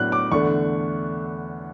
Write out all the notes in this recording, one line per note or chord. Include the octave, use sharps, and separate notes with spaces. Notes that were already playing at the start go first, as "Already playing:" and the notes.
Already playing: A2 F#3 B3 D4 F#6
D6
E2 D3 A3 D4 C#6